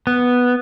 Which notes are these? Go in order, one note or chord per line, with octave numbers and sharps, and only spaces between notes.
B3